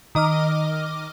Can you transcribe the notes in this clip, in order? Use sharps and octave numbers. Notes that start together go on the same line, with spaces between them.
D#3 D#5 D6 F6